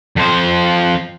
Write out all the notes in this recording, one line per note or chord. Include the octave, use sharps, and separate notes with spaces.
F2 C5